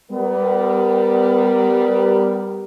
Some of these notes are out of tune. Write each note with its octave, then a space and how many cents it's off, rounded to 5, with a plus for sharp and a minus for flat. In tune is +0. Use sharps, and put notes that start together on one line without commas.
G3 +0 B3 +25 A#4 +0